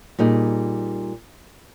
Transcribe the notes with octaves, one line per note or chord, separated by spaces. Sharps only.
A#2 G3 D#4 G#4